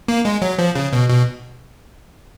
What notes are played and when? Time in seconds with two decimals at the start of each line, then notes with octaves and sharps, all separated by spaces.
0.08 A#3
0.25 G#3
0.42 F#3
0.59 F3
0.75 C#3
0.93 B2
1.10 B2